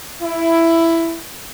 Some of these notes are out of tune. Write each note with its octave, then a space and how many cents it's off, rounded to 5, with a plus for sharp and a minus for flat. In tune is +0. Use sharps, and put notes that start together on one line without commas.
E4 +10